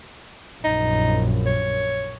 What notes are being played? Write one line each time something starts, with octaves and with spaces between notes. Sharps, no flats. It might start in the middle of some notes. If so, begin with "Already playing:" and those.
A#1 F#2 D#4
C#5